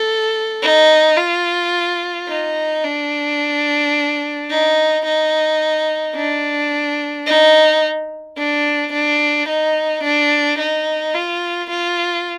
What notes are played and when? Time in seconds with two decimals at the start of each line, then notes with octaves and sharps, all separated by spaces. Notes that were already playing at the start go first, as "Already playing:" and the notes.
Already playing: A4
0.63 D#4
1.18 F4
2.28 D#4
2.84 D4
4.50 D#4
5.05 D#4
6.15 D4
7.26 D#4
8.37 D4
8.93 D4
9.48 D#4
10.03 D4
10.59 D#4
11.14 F4
11.70 F4